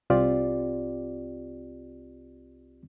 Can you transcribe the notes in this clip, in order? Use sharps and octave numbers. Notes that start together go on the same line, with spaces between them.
C2 C4 F4 G4 D5